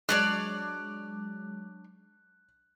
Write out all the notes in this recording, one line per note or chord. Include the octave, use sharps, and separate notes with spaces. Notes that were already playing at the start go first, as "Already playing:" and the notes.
F#3 G#3 D4 C#5 D5 F#6